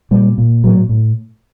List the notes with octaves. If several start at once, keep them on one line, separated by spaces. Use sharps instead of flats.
A#2 G3
A#2
A2 F#3
A2